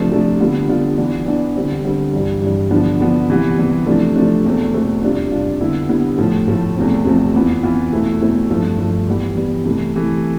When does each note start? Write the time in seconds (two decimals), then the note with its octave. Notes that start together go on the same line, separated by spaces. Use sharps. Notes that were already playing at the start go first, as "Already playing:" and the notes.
Already playing: C3 F3 A3 D4
0.11 C3 F3 A3 D4
0.40 D3 G3 B3 F4
0.69 D3 G3 B3 F4
0.98 E3 B3 D4
1.26 E3 B3 D4
1.56 D3 G3 C4
1.84 D3 G3 C4
2.13 G2 E3 G3
2.42 G2 E3 G3
2.71 D3 F3 B3 D4
3.00 D3 F3 B3 D4
3.30 C3 E3 G3 B3
3.59 C3 E3 G3 B3
3.86 C3 F3 A3 D4
4.16 C3 F3 A3 D4
4.45 E2 B2 A3 C4
4.74 E2 B2 A3 C4
5.03 F2 C3 G3 D4 F4
5.32 F2 C3 G3 D4 F4
5.60 D3 G3 B3 E4
5.89 D3 G3 B3 E4
6.18 A2 F3 A3
6.48 A2 F3 A3
6.76 E2 C3 F3 A3 C4
7.05 E2 C3 F3 A3 C4
7.33 F2 E3 B3 F4
7.63 F2 E3 B3 F4
7.92 E2 B2 A3 C4 E4
8.21 E2 B2 A3 C4 E4
8.50 G2 F3 A3
8.79 G2 F3 A3
9.08 E3 G3 B3
9.36 E3 G3 B3
9.66 C3 E3 A3
9.95 C3 E3 A3